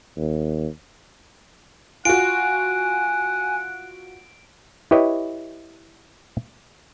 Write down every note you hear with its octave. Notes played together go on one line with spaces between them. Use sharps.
D#2
F4 F#4 F#5 G#5 D7
E4 G4 B4 C#5 D#5